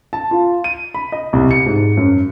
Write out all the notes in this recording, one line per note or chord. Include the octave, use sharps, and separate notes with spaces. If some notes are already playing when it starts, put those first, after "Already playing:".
A5
F4
D#7
B5
D#5
C2
C#7
G#2
F#2